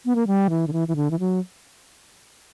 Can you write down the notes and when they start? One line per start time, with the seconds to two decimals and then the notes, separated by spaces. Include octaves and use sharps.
0.06 B3
0.15 A#3
0.27 G3
0.50 E3
0.67 D3
0.73 E3
0.88 E3
0.96 D3
1.11 E3
1.19 F#3